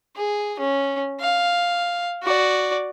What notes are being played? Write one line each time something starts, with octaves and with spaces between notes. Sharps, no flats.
G#4
C#4
F5
F#4 D5